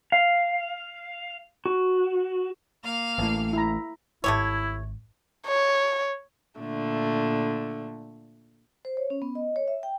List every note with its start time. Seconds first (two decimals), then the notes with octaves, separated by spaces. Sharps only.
0.12 F5
1.66 F#4
2.83 A#3 F5
3.18 A1 A2
3.53 E4 A#5
4.24 G#1 A3 E4 G4 C#5
5.47 C#5
6.59 A#2 D3 A3
8.85 C5
8.97 C#5
9.10 C#4
9.22 B3
9.35 D#5
9.56 C#5
9.68 E5
9.83 G5